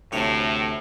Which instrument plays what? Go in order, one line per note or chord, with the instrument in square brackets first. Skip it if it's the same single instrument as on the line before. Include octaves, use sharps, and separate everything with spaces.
[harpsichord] D2 C3 C#5 [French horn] A2